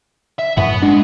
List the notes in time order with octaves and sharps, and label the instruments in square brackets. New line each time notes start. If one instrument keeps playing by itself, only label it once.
[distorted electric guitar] E5
[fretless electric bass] F#2 A2 [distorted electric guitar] F#5 B5
[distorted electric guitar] G#3 [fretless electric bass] D4